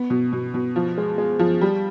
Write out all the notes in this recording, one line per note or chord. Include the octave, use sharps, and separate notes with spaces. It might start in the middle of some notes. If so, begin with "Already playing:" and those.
Already playing: B3
B2
B2
B2
F3
G#3
G#3
F3
G3